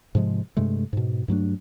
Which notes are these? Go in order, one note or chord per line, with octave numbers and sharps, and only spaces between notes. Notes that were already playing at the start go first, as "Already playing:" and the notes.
G#2 C3 F3 G#3
G2 C3 G#3 A3
G#2 B2
G2 F#3 A3 D4